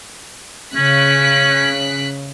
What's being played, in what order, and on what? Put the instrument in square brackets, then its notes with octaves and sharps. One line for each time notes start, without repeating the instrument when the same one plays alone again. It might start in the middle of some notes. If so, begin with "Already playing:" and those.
[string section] C#3 F#6 B6 [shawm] C#4